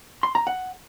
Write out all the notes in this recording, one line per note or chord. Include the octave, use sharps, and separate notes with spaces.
C6
A#5
F#5